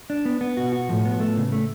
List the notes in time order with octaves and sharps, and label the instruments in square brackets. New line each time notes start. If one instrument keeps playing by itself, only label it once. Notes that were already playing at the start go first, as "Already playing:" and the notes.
[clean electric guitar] D4
B3
B3
[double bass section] B2 [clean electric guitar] F#4
[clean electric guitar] F#4
[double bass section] A2 [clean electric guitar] F3
[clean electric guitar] B3
A3
C#3
A3